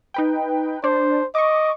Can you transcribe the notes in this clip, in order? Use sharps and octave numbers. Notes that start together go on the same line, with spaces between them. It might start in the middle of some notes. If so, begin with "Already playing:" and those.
D#4 B4 G5
D4 C5
D#5 C#6 D6